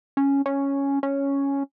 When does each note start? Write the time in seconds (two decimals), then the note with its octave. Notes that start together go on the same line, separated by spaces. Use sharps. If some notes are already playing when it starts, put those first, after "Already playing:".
0.17 C#4
0.46 C#4
1.03 C#4